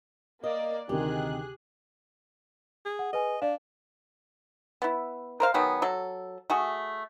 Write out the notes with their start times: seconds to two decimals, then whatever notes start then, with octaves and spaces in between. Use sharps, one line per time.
0.44 A#3 D5 D#5
0.89 D2 C3 D#3 G4 G#4 F#6
2.85 G#4
2.99 F#5
3.13 G#4 B4 D#5 G#5
3.42 D4 D5 F5
4.82 B3 E4
5.40 A#4 C5 F5
5.54 D#3 F#3 B3 G#4
5.82 F#3 A4
6.50 A3 F#4 G#4